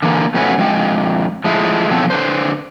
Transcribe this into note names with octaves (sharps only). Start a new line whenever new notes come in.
D3 E3 A#3
F2 B2 A3 C#4 F#4 B4
F2 G#3 G5
F3 G#3 A3 E4
B2 D3 F3 F#3 C4 A4
D3 D4 B4 C5